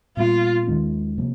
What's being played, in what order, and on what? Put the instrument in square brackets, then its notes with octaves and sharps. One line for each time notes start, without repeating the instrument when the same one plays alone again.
[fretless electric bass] A#2 G3 B3 [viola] F4
[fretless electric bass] D#2 D#3 G#3 C#4
C3 F3 A#3